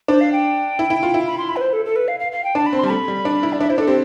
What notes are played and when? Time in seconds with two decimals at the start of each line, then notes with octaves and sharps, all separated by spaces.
0.08 D4 C5
0.21 F5
0.32 G5
0.79 E4
0.90 E4
1.03 F4
1.14 E4
1.27 B5
1.38 C6
1.49 B5
1.56 B4
1.61 C5
1.73 A4
1.85 A4
1.96 B4
2.08 F5
2.20 F5
2.32 F5
2.44 G5
2.55 D4 A5
2.66 B5
2.73 C4
2.79 G3 C6
2.86 A5
2.90 A3 B5
3.08 G3
3.25 D4
3.43 E4
3.53 D5
3.60 D4 E5
3.69 E4 C5
3.78 D4 A4
3.87 C4 G4